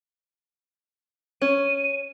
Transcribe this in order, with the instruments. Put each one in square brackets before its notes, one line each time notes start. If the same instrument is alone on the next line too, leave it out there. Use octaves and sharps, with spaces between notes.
[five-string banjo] C#4 [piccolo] D#7